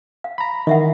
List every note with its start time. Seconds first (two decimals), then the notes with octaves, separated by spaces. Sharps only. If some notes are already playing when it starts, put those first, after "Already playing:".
0.24 F5
0.38 A#5 B5
0.67 D#3 E3 D#5 E5 F#5